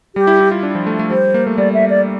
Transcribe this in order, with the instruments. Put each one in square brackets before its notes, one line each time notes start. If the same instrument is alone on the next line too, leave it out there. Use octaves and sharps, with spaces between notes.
[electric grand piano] G3 [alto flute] G4
[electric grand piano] E4
E4
F4
D4
F3
A3
A3
[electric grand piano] G3 [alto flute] C5
[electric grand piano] A#3
A3
[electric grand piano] G3 [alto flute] D5
[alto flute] E5
D5